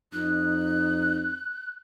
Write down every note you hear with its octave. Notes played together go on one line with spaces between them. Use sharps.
F2 D#4 F#6